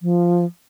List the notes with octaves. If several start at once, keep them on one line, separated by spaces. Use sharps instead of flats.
F3